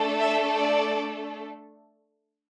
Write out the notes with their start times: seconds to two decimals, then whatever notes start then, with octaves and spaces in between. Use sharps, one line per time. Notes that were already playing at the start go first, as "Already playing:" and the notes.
Already playing: A3 D4 A4
0.19 E5
0.55 D5